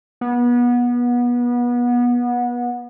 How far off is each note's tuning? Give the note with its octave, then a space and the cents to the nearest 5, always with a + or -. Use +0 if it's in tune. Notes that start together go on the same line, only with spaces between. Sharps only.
B3 -25